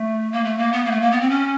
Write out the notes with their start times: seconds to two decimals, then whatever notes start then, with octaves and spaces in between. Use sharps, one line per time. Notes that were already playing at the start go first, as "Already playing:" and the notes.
Already playing: A3
0.32 A#3
0.44 A3
0.58 A#3
0.72 B3
0.85 A#3
0.91 A3
1.01 A#3
1.11 B3
1.21 C4
1.30 C#4